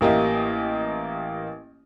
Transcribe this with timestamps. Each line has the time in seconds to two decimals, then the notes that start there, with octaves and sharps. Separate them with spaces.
0.01 A1 A#3 G4 D#5 E5